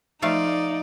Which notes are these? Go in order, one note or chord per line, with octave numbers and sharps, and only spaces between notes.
F3 A3 D#4 D5 F5